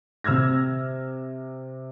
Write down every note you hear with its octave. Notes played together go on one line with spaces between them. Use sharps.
C3 E6 F6 G#6 A#6